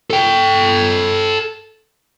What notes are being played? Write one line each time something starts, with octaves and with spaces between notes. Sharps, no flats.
A4 G5